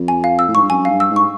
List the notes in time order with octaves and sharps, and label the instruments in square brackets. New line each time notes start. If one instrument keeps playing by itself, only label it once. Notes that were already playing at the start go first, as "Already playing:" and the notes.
Already playing: [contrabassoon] F2
[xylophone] G#5
F5
E6
[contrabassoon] A2
[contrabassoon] G#2 [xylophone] C#6
[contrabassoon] G2
[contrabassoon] F#2 [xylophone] G#5
[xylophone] F5
[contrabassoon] G2
[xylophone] E6
[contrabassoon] G#2
[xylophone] C#6